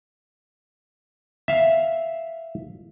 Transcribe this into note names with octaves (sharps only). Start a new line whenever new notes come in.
E5 F5